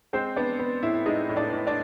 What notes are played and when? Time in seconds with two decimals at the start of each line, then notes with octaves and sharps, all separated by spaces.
0.13 G#3 C4 C5
0.36 B3 D4 D5
0.59 B3
0.83 A2 E4 E5
1.06 G#3 D#4 D#5
1.29 A2
1.36 D4 D5
1.52 A2
1.67 D4 D5